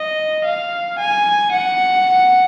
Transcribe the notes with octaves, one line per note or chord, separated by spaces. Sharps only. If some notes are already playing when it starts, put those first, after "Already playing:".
Already playing: D#5
F5
G#5
F#5